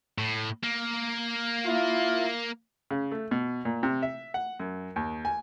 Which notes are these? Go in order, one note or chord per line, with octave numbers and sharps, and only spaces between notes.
A2
A#3
E4 F4
C#3
A3
B2
A#2
C3
E5
F#5
F#2
D#2
G#5